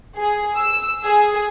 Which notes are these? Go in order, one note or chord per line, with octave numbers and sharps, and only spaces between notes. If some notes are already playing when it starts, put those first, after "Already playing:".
G#4
E6
G#4